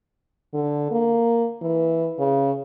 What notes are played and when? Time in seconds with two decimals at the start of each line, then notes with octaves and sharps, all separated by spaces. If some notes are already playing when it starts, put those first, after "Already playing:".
0.54 D3
0.91 A#3
1.62 E3
2.19 C#3